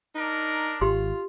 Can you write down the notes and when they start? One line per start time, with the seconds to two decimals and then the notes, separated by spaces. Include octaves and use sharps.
0.15 D4 D#4 A#4
0.81 G#1 F4 G4 C6